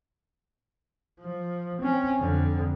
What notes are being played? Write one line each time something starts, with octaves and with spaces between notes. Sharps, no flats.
F3
C4 C#4
F2 D3